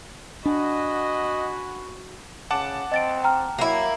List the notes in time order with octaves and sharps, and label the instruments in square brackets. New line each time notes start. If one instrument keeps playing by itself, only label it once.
[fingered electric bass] D4 [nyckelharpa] F#4 [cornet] D#5 [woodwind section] F#5 G#5 B5
[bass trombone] C#3 [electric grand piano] F#5 A5 D6
[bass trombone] C4 [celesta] D#5 A6 D7
[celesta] G5 A#5 F6
[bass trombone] F#3 [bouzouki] A#3 E4